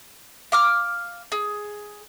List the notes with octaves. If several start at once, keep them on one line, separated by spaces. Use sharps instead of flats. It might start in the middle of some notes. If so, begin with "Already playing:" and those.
F5 D6 F6
G#4